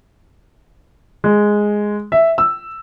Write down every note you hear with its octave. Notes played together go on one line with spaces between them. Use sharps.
G#3
E5
E6